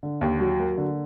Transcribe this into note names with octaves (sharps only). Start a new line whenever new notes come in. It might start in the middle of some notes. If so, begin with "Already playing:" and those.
D3
D#2
F#3
A#3
D3